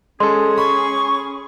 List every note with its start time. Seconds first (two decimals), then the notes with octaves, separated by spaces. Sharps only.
0.20 G#3 C#4 G#4 A4 C6
0.58 B5 C#6